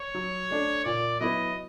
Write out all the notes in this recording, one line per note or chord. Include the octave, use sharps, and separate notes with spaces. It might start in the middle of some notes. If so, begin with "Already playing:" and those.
Already playing: C#5
F#3
A3 D4
A#2 D5
F#3 B3 E4 D#5